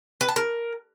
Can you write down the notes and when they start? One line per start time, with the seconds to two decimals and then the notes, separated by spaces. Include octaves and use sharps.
0.21 B4
0.28 A5
0.36 A#4